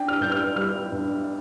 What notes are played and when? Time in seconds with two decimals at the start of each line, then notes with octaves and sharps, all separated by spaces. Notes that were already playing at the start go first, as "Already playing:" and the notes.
Already playing: D4 G5
0.08 F6
0.21 G2 G6
0.32 F6
0.56 G3 F6
0.92 G2